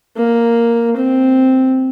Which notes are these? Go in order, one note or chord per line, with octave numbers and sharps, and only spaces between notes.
A#3
C4